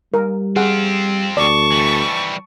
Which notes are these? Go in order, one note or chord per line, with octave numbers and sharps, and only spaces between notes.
G3 A#4
C4 F4 G#4 F#5
D2 D5 A5 C#6
E3 G3